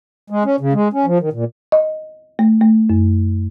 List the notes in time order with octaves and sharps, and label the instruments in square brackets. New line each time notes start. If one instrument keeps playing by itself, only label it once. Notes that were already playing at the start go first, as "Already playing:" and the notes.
[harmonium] G#3
C#4
C#3
G#3
C#4
F3
D#3
A#2
[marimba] D#5
A3
A3
F#2